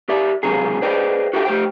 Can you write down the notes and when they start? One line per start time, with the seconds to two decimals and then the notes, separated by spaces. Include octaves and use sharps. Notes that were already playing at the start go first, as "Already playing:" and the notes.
0.09 G4 D5 E5
0.43 C#2 C3 D#3 F#3 G#4
0.82 G#4 B4 C5 D5 D#5 G5
1.33 F#4 G4 A4 E5 F#5 G5
1.45 A3 G4 C5 G5